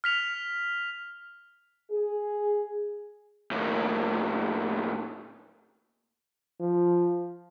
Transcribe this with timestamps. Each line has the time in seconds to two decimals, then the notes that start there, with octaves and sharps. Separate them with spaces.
0.04 F6 B6 F7
1.91 G#4
3.51 D#2 A2
6.60 F3